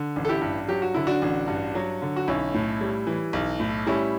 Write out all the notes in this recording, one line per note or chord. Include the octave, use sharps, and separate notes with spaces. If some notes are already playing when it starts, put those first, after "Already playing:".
Already playing: D3
A1
A4
E4 G4
G2
F#3 G4
F#4
D3 E4
D4 F#4
A1
G2
F#3
D3
F#4
B1 C#4 E4
A2
G3
E3
B1
A2
G3 C#4 E4